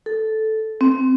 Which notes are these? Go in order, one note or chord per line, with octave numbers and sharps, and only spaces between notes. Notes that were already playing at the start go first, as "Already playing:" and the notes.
A4
C4